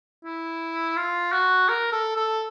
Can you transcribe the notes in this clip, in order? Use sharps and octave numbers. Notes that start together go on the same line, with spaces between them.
E4
F4
F#4
A#4
A4
A4